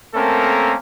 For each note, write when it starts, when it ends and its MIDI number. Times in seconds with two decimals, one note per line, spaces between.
0.15 0.75 57
0.15 0.75 58
0.15 0.75 60
0.15 0.75 61
0.15 0.75 69
0.15 0.75 70